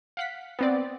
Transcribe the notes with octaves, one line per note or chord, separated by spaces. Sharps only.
F5 F#5 B6
B3 C4 D5